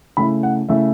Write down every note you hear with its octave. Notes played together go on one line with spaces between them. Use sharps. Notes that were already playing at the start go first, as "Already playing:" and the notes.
C#3 A3 E4 B5
F#5
C#3 A3 E4 E5